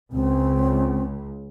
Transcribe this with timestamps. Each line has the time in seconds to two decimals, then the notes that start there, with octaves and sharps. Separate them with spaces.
0.13 C#2 C4